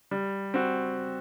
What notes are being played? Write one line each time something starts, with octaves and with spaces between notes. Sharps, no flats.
G3
C4 F#4